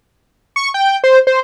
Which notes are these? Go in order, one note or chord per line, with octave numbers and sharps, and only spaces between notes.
C#6
G5
C5
C5